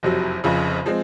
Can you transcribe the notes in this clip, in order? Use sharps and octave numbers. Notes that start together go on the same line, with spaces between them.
F#1 F2 C3 F#3
F1 F2 C#3
F3 G#3 C4